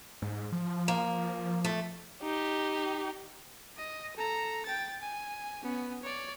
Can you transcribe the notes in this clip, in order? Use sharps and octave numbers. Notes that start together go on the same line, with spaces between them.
G#2
F3
A#3
A3
D#4 G4
D#5
A4 A#5
G5 A6
G#5
B3 C#4
C#5 D5